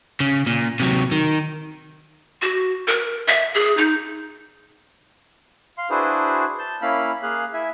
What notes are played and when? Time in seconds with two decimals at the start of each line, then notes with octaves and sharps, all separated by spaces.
0.20 C#3
0.47 A#2
0.80 C3 F#3
1.12 D#3
2.42 F#4
2.88 A#4
3.28 E5
3.54 G#4
3.77 D#4
5.78 F5 C6
5.90 D4 E4 F#4 G#4 B4 C5
6.59 A5 G6
6.82 A#3 C#4 E4 F5 B5
7.23 A#3 G#4 F5 F#6
7.53 E4 E5 G#5